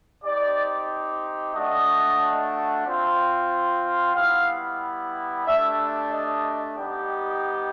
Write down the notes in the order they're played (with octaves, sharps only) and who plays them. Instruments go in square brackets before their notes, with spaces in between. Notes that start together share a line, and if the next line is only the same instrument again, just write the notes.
[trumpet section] C4 D#4 G4 D5
A3 D4 F#4 D#5
C4 F4
G3 B3 E4 F5
A3 D4 G4 E5
D#5
G3 B3 D#4 G4